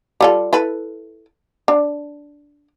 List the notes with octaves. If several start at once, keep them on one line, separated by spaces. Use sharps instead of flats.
G3 F4 A4
E4 A4 B4
D4